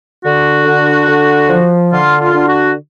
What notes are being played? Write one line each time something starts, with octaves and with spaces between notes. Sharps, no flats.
D3 F#4
D3
D3
F3
D3 F4
F4
D3
F#4